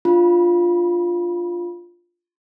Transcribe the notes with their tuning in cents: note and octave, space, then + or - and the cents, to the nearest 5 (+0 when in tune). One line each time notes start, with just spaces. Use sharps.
D4 +0 F4 +0 B5 -30